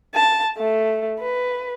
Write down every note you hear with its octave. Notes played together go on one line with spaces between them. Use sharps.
A5
A3
B4